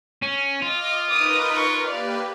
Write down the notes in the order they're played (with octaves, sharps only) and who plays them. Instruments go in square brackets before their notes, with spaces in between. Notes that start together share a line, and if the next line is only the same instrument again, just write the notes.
[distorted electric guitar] C#4
[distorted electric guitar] F4 [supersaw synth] D#5 D6
[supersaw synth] D#4 A#4 B4 [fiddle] D6 D#6
[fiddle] C#6
[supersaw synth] A#3 G4 B4 [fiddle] D5 F5